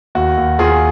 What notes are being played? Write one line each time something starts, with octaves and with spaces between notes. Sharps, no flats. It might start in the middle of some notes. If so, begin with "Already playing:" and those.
D#2 F#4
D#2
D#2 F4 G#4